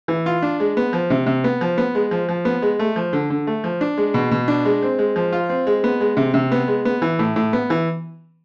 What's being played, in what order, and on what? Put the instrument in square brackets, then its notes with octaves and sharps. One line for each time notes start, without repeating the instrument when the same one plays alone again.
[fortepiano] E3
F4
D4
G#3
B3
F3
C3
C3
B3
F3
B3
G#3
F3
F3
B3
G#3
A3
F3
D3
D3
A3
F3
D4
G#3
B2
B2
D4
G#3
C4
G#3
F3
F4
C4
G#3
B3
G#3
C3
C3
B3
G#3
B3
E3
A2
A2
B3
E3